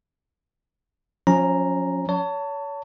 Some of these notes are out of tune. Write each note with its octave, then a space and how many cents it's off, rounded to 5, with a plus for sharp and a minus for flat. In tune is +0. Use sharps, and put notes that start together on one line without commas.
F3 +40 C#4 +0 A#5 +0
C#5 +30 A5 +25